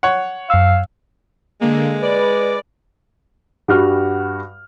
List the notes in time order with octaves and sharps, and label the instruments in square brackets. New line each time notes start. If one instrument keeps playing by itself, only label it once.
[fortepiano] C#5 F#5
[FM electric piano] F#2 E6 [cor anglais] F5
[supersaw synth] D3 A#3 [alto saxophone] G#3
[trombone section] B4 [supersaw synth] D5
[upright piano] G2 G3 F#4 F#5 F6